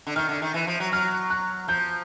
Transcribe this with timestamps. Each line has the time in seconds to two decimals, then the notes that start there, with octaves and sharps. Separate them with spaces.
0.07 D3
0.16 D#3 F6
0.29 D3
0.42 D#3
0.54 E3
0.67 F3
0.80 F#3
0.92 F#3 F6
1.30 F#6
1.68 F3 G6